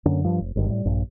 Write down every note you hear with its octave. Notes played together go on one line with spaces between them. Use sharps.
F#2 D3 A#3 C#4
G2 F3
F1
G#1 G2 D#3
A2 G3
A#1 G2